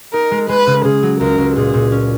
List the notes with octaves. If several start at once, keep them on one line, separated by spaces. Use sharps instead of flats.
D#4 A#4
G#3
G#3 B4
C#3
C#3 G#4
F#3
C#2 A#4
C#2
A#2 G#4
A#2
C#4